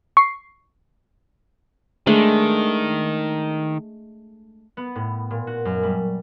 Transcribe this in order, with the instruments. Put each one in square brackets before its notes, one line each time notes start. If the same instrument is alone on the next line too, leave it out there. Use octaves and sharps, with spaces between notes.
[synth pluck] C#6 C7
[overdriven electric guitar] D#3 [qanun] G#3 A3 D4
[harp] B3
A2
A#2
F#4
F#2
G3